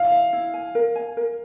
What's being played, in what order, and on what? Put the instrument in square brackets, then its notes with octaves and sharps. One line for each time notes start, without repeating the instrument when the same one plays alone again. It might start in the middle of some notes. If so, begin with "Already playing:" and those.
Already playing: [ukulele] E4 [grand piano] F5
[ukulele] E5
E4
G#5
A#4
G#5
A#4